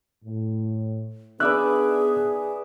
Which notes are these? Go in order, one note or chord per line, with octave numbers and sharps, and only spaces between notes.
A2
B3 D4 D#4 G#4 B4 D5 E5 F#6